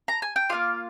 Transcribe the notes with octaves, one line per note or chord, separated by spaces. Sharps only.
A#5
G#5
G5
A#3 D4 F4 F5